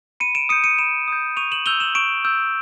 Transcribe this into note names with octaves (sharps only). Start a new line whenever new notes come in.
B5 C#7 D#7
D7 E7
D#6 G6 C#7 D#7
C#7 D#7
B5 D7 E7
D#6 G6
C#6 D#7 F7
E7 F#7
E6 G6 F7 G7
E7 F#7
C#6 D7 E7
E6 G6